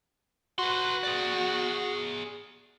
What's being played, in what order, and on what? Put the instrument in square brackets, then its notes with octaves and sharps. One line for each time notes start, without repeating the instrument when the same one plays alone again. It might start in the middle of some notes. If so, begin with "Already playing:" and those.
[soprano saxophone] F#4 [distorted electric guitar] B4 C6
[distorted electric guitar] G#4 D5